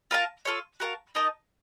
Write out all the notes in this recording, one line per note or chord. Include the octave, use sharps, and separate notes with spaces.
F4 A#4 F5 A5
F4 A4 C#5
F#4 A#4 F5 A5
D#4 A#4 D#5 A5